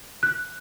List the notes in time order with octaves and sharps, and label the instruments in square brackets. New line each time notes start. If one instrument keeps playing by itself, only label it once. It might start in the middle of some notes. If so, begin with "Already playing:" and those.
[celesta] F#6